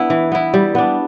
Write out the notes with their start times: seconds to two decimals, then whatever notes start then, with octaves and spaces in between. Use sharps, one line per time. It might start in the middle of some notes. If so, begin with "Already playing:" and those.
Already playing: B3 D4 E4
0.10 E3
0.32 B3 E4
0.54 G3
0.75 B3 D4